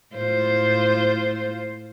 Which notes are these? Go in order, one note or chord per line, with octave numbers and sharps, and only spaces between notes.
A2 F4 C5